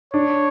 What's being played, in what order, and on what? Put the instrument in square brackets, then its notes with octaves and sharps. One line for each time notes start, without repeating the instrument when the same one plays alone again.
[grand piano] D4 [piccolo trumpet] C#5